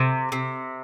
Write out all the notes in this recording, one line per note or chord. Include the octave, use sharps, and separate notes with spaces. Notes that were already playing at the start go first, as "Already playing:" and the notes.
Already playing: C3
C3